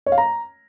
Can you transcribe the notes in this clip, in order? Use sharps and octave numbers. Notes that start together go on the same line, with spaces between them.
C#5
F5
A#5